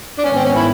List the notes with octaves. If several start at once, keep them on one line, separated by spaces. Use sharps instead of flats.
D4
G#2 D#3 G3 B3 C#4
C4
C#4
E4